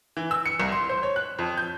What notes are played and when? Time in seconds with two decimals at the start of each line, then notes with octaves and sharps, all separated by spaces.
0.17 E3
0.31 E6
0.46 C#7
0.60 C2
0.72 C6
0.89 C5
1.03 C#5
1.16 F#6
1.39 F2
1.57 G6